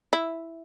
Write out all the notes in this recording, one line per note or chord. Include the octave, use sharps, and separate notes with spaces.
E4